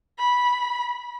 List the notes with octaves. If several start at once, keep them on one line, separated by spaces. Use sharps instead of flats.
B5